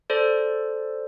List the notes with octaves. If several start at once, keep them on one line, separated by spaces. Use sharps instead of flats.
A4 C5 D5